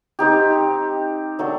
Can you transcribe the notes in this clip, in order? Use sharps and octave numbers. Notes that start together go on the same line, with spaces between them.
C4 D#4 G4
F#3 A3 D4